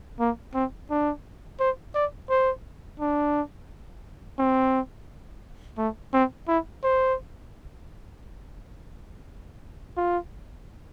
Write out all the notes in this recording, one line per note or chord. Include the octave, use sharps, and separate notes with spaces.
A#3
C4
D4
C5
D5
C5
D4
C4
A3
C4
E4
C5
F4